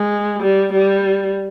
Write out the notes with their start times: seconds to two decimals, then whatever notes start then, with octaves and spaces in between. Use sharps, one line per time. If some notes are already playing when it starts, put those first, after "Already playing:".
Already playing: G#3
0.42 G3
0.72 G3